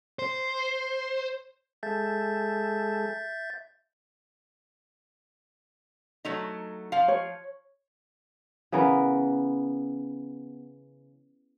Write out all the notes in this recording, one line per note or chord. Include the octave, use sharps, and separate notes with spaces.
C5
G#3 A4 E5 G6 A6
F#3 A3 D#4
F3 F5
C#5
C#3 E3 B3 A#4